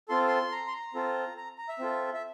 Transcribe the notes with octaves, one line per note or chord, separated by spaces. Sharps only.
C4 F4 A4 C6
C6
A#5
C6
A#5
C4 F4 A4
A#5
A#5
E5
C4 F4 A4
E5